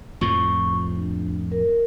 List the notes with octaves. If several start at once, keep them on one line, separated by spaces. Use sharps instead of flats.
F2 A2 F3 C#6
D4
A#4